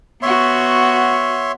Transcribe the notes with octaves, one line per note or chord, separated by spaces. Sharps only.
B3 F#4 C#5 E5 C6